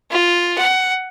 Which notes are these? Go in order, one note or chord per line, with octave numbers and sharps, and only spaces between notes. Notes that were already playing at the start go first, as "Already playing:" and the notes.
F4
F#5